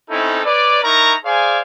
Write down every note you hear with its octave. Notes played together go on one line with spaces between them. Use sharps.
C4 C#4 D#4 E4 A4
B4 C#5 D5
D#4 E4 A#4 A#5 C#6
G#4 C5 D5 F5 G#5